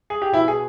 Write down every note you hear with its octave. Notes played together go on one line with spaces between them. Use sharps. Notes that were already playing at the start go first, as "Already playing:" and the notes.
G#4
G4
B2 E4
G#4